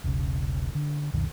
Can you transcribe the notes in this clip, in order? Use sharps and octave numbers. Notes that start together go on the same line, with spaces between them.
E1 B1 C#3
D3
C#2 F#2 B2 D#3